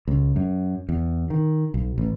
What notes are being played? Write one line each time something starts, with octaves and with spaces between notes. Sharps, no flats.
C#2
F#2
E2
D#3
B1
A1